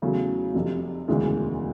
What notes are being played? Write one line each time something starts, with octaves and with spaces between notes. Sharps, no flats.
E2 C#3 F#3 A3
F1 F2 C3
E1 D2 C#3 E3 G#3